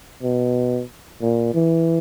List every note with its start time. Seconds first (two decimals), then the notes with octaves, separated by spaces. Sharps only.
0.22 B2
1.22 A#2
1.54 E3